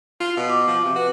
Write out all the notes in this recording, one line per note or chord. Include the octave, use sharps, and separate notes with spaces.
F4
B2
D6
F3
C3
F#4 B4